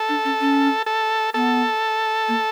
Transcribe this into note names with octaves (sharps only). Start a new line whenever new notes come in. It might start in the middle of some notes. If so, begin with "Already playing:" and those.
Already playing: A4
D4
C#4
C#4
A4
B3 A4
A#3